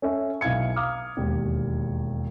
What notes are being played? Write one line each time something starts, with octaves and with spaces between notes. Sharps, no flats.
C#4 A4 E5
B1 E4 F5 G#6 C#7
F5 A#5 D6 D#6 F6
E1 D#2